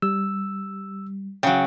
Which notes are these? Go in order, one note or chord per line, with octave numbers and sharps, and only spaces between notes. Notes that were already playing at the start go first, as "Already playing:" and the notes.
G3 E6
C#3 F#3 G5